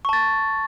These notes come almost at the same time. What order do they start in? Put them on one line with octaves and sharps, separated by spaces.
C#6 A5 A6